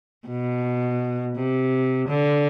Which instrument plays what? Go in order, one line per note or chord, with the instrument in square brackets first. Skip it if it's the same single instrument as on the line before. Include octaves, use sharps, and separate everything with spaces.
[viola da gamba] B2
C3
D3